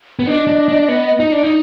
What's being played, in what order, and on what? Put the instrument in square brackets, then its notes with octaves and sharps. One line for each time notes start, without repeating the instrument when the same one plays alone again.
[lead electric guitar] B3
[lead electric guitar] D4 [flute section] D#5
[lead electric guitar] D4
D4
B3
D#4
D4
D#4